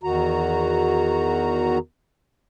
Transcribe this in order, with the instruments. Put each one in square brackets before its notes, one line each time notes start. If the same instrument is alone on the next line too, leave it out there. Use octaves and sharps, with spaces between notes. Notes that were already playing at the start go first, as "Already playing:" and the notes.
[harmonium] E2 D#3 F#4 A#5